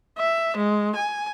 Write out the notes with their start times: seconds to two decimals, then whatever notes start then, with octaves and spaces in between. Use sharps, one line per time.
0.18 E5
0.56 G#3
0.95 G#5